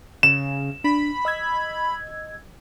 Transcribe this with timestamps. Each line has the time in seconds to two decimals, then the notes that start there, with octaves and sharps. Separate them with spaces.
0.23 C#3 E7
0.84 D4 B5
1.25 D#5 E6 G#6